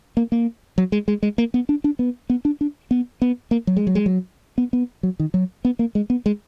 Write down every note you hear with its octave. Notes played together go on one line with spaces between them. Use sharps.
A#3
A#3
F#3
G#3
G#3
G#3
A#3
B3
D4
D4
B3
B3
D4
D4
B3
B3
A#3
F#3
G#3
F#3
G#3
F#3
B3
B3
F#3
D#3
F#3
B3
A#3
G#3
B3
G#3